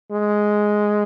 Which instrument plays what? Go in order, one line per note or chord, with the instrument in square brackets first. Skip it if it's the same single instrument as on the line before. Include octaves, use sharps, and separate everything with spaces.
[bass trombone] G#3